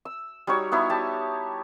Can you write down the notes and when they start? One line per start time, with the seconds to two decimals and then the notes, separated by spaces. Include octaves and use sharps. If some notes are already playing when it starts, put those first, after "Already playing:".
0.05 E6
0.47 G3 D#4 F#4 C#5
0.72 B3 D#4 E4 C#5
0.90 G4 A5